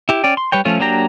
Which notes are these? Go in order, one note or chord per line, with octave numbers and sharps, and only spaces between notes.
E4 G4
C#4 D5 G5
C6
G3 B4 C#5 G5
F3 A3 C#4 F4
F#3 A#3 D4 G4 A#5